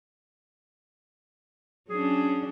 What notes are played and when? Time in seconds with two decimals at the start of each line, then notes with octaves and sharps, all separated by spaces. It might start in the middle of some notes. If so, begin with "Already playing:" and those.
1.90 F#3 C#4 D4 G#4